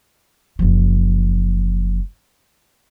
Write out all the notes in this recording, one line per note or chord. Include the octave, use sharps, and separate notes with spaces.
F#1 F3